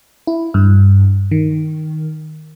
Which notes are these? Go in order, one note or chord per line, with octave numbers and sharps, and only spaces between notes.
E4
G2
D#3